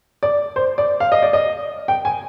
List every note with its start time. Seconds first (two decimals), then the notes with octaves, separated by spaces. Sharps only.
0.23 D5
0.56 C5
0.78 D5
1.00 F5
1.12 D#5
1.22 D5
1.33 D#5
1.88 G5
2.05 G#5